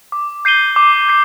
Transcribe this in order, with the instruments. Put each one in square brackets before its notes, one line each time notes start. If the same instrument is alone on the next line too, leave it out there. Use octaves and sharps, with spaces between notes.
[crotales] D6
G6 C7 D#7 G7
D6
G6 C7